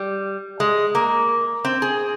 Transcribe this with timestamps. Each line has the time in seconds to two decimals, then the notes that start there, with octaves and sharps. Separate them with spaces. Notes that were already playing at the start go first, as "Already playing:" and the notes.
Already playing: G3
0.60 G#3
0.95 A#3
1.65 C4
1.82 G#4